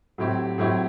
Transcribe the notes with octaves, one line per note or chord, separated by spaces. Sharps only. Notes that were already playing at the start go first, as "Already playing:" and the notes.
A2 F#3 C4 E4 G4
A2 F#3 C4 E4 G4